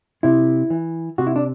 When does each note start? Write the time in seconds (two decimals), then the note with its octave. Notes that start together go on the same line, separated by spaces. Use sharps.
0.23 C3 E4
0.70 E3
1.18 C3 F#4
1.27 E4
1.36 D4